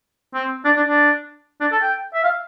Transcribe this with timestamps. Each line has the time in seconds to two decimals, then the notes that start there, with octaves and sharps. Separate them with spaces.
0.34 C4
0.65 D4
0.76 D4
0.88 D4
1.61 D4
1.72 A4
1.82 G5
2.14 E5
2.24 F5